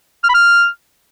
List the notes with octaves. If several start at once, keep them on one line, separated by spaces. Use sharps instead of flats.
F6
B5
F6